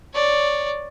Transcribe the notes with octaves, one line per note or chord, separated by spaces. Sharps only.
C#5 D5